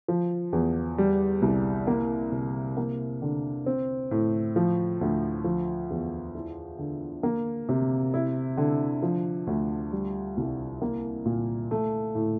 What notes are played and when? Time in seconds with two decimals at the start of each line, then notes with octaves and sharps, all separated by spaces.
0.08 F3
0.53 E2
0.98 G3
1.42 C2
1.87 A#3
2.32 C3
2.77 A#3
3.22 D3
3.66 C4
4.11 A2
4.56 F3
5.01 D2
5.44 F3
5.90 E2
6.35 E4
6.79 D3
7.23 A#3
7.69 C3
8.14 E4
8.57 D3
9.02 F3
9.47 D2
9.92 G3
10.37 C2
10.82 A#3
11.25 A#2
11.71 A3
12.15 A2